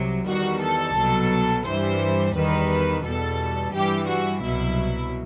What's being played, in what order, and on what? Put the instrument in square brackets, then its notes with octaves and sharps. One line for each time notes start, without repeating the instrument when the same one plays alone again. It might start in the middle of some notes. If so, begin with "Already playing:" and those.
Already playing: [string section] C2 C3 F#3
E2 D#3 G3 F#4
A4
C2 B2 F#3
G2 E3 G3 C5
E2 D#3 G3 B4
E2 B2 G3 A4
G2 E3 G3 G4
F#4
C2 B2 F#3 E4